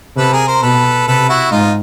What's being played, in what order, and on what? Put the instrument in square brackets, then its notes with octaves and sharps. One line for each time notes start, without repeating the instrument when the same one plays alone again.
[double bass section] C3 [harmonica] A4 B4
[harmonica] G#4 A#4
A#4 C5
[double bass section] B2 [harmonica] A4 B4
[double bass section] C3 [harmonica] A4 B4
[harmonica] E4 F#4
[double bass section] G#2 [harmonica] D#4 F4